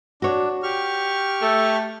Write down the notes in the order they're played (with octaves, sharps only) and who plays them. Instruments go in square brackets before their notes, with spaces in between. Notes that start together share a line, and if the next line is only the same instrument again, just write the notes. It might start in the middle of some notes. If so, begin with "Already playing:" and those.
[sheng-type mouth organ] D4 [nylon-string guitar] F#4 C#5
[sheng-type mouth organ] G4 C#6 F6
[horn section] A3